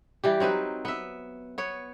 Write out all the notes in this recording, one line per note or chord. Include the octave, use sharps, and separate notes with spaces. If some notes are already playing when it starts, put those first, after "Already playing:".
E3 G3 G4
F#3 C4 D#4 B4
B3 E5
B3 C#5